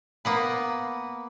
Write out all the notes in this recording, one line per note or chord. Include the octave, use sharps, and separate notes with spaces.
A#3 B3 B4